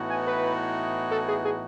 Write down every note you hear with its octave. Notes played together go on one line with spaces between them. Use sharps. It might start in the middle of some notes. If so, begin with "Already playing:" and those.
Already playing: A2 E3 B3 D#4 F#4
G#5
B4
A4
G#4
G#4